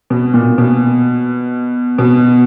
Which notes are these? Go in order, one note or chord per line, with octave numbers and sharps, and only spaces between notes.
B2
A#2
B2
B2